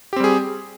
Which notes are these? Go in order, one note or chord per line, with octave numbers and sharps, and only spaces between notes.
G3 C4 G4 G#4